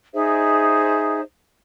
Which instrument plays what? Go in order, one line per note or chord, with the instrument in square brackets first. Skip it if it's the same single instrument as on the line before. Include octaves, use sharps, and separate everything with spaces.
[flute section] D#4 G#4 C5 E5